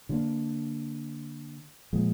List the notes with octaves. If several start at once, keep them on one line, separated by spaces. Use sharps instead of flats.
D3 F#3 A#3 D4
A#2 F3 G#3